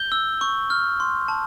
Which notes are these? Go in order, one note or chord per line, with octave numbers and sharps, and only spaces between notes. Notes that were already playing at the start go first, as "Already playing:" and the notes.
Already playing: G6 G7
E6
C#6
F6
C6
A5